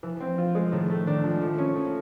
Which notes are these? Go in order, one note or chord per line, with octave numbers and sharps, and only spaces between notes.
E3 F3
C4
F4
G#3
A2 D#3
A3
D#3 D4
F3
G#3
F3 A3
C#4
F3 A3
A#3